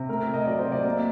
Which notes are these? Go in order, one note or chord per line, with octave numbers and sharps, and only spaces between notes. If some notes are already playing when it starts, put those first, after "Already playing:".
Already playing: C3
A3 A#4
A#4
C3
D#5
F#3 D5
C5
C3
D5
A#3